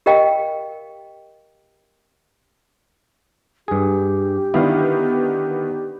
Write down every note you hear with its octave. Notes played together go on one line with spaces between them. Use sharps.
G4 A#4 D#5 F5 G5
G2 G4 G#4
D3 D#3 B3 E4 F5